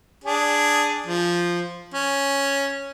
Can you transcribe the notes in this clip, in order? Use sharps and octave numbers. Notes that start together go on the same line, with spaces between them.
D4 G#4
F3
C#4